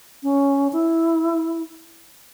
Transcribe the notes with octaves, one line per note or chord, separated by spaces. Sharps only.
C#4
E4